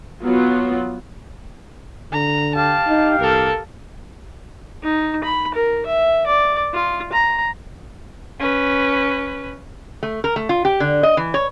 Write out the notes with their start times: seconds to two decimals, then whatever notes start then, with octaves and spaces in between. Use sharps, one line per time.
0.24 F#3 B3 F4
2.13 D3 A#5
2.55 G4 F5 A5
2.87 D#4
3.19 C2 A4 A#4
4.83 D#4
5.24 B5
5.54 A#4
5.86 E5
6.27 D5
6.73 F4
7.12 A#5
8.40 C#4 B4
10.03 A3
10.24 A#4
10.36 A3
10.49 F4
10.65 G4
10.80 D3
11.03 D#5
11.17 E3
11.34 C#5